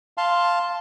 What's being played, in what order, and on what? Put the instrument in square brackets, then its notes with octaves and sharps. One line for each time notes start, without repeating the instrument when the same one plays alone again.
[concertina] F5 A5 C6